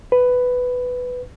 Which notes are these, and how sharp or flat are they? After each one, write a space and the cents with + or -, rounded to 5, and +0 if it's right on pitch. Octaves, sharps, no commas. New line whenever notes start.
B4 +10